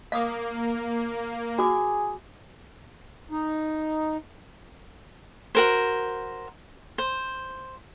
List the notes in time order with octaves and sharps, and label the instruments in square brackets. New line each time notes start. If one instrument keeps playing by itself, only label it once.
[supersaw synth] A#3 [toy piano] F5 D6 D#6
[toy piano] F#4 D6 [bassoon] G#4
[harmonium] D#4
[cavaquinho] F#4 A#4 C5
C5